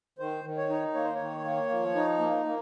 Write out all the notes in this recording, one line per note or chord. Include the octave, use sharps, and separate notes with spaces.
D#3 C5
D#3
C#5
D#4
A#3 C#5
C5
D#3 C#5
A#3
F3
D#4
A#3
A#3